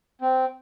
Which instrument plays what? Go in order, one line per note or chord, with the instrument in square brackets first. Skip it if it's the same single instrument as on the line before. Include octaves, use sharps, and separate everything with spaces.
[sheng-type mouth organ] C4